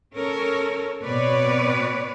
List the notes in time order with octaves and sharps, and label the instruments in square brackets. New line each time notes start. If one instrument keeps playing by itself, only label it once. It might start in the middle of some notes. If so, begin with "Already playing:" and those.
[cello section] C#4 A4 A#4 C#5
B2 C4 B4 C#5 D5